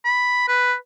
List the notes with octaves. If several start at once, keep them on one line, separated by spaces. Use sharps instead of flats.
B5
B4